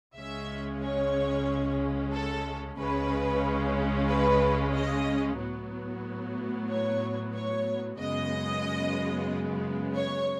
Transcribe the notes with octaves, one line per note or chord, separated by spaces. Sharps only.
C#2 C#3 G#3 C#4 E5
C#5
A4
C#2 C#3 G#3 C#4 B4
B4
D#5
A2 F#3 B3
C#5
C#5
F#2 C#3 G#3 B3 D#5
C#5